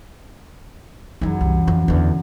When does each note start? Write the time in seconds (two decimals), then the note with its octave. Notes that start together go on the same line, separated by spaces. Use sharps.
1.21 F#2 E3 F#3 D#4
1.41 C2
1.67 F2 F3
1.88 E2 D3